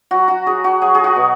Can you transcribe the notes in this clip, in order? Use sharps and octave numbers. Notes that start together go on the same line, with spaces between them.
F#3 F#4
F#4
F#3 G#4
F#4
F#3 G#4
G#4
F#4
B2